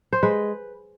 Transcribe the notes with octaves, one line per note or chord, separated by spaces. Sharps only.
C5
G#3 B4